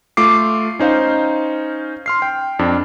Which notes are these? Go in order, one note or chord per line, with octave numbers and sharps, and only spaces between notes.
A3 F4 D6 C7
C#4 D#4 C5 F5
C6 F6 C7
G5
F2 D4